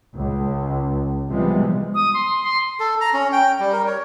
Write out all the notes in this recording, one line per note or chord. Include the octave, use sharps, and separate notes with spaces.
C#2
C3 E3 F3 G3 G#3 B3
D#6
C6
C6
A4
A#5
C#4
G5
G3
A#4
C#5